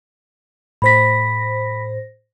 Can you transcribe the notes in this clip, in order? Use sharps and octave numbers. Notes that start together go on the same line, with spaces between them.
A2 C5 B5 A#6 B6